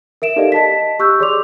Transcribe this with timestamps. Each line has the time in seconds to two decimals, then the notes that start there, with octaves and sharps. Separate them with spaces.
0.22 A#4 E5 D7 E7
0.36 D#4 G4 A4 D5 D#5 F5
0.52 D#5 A5 B6
0.99 G4 C#6 E6 F#6 G6
1.20 G#4 C#5 D5 C6 D6 F7